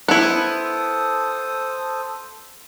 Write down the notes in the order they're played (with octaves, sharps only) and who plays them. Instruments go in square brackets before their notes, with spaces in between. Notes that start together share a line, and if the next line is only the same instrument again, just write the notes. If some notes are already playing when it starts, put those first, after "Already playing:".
[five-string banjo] B3 E4 [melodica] A4 C5 D#6